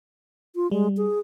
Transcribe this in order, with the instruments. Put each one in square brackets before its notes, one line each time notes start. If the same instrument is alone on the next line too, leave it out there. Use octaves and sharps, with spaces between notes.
[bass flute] F4
[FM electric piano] G3 [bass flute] G#3
[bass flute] G#4